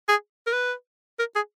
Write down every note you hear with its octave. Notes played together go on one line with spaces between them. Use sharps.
G#4
A#4
B4
A#4
G#4